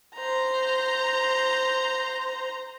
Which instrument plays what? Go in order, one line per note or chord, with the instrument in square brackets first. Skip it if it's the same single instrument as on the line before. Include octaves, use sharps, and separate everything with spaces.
[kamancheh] C5 A#5